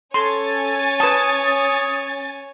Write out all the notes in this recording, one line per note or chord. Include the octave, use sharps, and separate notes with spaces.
C#4 A4 C#5 G#5 C6 A6
B4 A5 D#6